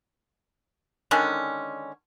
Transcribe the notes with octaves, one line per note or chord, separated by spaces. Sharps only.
D3 D#3 G#3 C#4